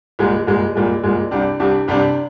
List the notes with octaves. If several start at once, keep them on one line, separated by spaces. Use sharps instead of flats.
C2 A#2 G#3
C2 A#2 G#3
C2 A#2 G#3
C2 A#2 G#3
C2 C3 G3 D4
C2 C3 G3 D4
C2 C3 G3 D4